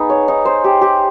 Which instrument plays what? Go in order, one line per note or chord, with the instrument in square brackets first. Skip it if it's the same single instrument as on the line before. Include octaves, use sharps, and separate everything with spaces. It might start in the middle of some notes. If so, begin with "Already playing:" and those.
Already playing: [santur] B3 D#4 G#4
C#5
D#4
C5
G4
G4